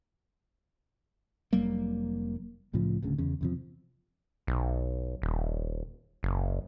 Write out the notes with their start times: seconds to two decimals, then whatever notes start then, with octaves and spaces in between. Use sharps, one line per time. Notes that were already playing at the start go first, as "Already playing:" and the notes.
1.53 F1 F#3 G3 A#3
2.73 C2 A2 C#3 F3
3.02 D1 D2 C#3
3.18 E2 C#3
3.41 E2 C3 F3
4.47 B1
5.22 D#1
6.23 F#1